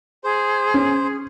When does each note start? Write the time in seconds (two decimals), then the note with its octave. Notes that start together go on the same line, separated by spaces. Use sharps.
0.24 G#4 C5
0.74 C#4